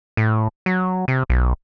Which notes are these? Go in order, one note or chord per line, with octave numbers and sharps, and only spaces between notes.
A2
F#3
C3
B1